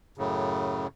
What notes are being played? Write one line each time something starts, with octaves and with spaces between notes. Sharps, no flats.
F#2 A2 C#3